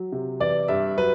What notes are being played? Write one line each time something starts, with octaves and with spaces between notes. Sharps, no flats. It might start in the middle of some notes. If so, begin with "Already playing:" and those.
Already playing: F#3
C3
E3 D5
G2 E5
F#3 B4